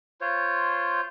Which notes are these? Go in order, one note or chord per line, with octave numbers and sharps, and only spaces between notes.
F4 C5 C#5